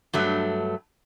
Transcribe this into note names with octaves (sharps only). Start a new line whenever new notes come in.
G2 F#3 A3